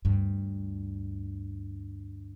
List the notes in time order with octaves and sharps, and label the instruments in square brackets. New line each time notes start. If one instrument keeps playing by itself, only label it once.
[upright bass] D2 G2